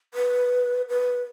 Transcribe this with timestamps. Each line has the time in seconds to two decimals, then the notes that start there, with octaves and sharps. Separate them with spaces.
0.14 B4
0.89 B4